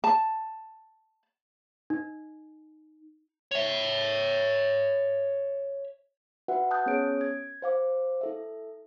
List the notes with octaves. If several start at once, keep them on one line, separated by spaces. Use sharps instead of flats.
A5
D#4
C#5 E5
F#4 B4 E5 F#5
A5 D#6 F#6 G6
B3 C#4 G#4 C#5 D7
G#6
C5 F5 D6
E4 A4 E5